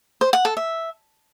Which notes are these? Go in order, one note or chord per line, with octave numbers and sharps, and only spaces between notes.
C5
F#5
A4
E5